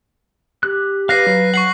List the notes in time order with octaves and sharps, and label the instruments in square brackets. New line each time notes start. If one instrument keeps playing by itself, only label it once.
[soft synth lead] G4 [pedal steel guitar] F#6
[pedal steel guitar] B4 F5 [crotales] F#6 A#6 C7
[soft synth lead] F#3
[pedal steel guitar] F#5 [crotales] C#6 C7 F#7